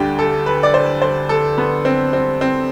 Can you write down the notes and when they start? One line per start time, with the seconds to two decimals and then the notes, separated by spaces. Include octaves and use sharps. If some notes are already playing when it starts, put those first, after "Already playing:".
Already playing: D2 D3 G3 G4
0.19 A4
0.46 B4
0.63 D5
0.74 C5
1.02 C5
1.29 A4
1.58 B3
1.85 C4
2.13 C4
2.41 C4